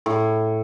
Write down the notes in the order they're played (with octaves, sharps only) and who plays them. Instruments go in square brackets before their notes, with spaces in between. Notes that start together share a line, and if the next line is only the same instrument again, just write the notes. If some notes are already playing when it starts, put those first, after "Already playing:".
[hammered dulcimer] A2